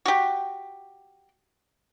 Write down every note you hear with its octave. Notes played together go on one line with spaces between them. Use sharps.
F#4 G4